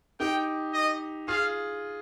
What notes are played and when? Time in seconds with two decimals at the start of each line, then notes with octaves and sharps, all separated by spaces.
0.20 D#4 G4 G5
0.73 D#5
1.28 F4 G#4 F5